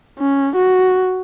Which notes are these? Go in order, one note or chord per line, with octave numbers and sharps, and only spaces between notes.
C#4
F#4